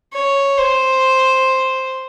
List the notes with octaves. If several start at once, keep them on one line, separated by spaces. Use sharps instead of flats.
C#5
C5